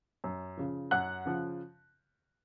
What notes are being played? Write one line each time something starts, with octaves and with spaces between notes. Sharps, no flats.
F#2
C#3 F3
F#2 F#5 F#6
C#3 F3